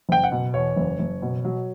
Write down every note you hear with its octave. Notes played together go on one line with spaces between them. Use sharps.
F#1 G5
F#5
B2
E2 C#5
F#1
F#1
B2
F#3